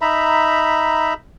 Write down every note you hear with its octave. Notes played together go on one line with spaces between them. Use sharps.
D#4 E5 A#5 B5